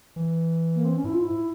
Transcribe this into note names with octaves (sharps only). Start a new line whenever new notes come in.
E3
A#3
C4
C#4
G#2 E4
F4
E4